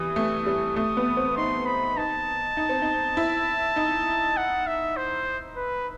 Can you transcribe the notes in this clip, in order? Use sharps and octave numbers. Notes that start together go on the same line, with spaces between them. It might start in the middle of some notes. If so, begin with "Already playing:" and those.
Already playing: E3 G3 D#6
A3
G3
A3 D#6
B3
C4
D#4 C6
B5
D#4 A5
D#4
C4
D#4
E4
D#4
F#5
E5
C5
B4